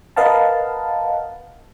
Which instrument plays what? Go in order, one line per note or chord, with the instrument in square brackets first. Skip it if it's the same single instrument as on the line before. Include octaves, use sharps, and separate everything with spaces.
[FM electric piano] A#4 B4 D#5 F5 F#5 A5